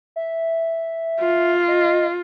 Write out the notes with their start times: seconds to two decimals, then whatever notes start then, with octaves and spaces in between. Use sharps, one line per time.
0.16 E5
1.20 F4
1.68 D#5